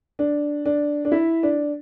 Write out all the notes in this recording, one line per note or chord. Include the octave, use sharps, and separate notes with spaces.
D4
D4
D4
E4
D4